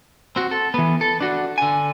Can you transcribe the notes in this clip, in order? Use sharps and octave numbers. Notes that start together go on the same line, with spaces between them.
C4 F#4
A4
E3 B3
A4
D4 F#4
D3 G#5